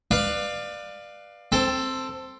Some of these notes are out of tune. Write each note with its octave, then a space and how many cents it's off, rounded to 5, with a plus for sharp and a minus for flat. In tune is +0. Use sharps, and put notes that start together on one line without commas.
B4 +0 D5 +25 F5 +0
C4 +0 A4 +10